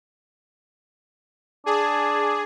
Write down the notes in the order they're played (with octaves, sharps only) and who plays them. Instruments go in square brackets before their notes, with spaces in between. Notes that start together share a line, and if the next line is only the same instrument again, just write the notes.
[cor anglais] D4 [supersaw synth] G#4